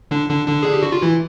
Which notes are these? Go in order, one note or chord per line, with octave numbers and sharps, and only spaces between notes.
D3 D4
D3 D4
D3 D4
G#4
G4
F#4
F4
E3 E4